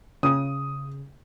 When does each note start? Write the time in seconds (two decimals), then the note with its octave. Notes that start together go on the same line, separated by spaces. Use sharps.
0.23 C#3 D#6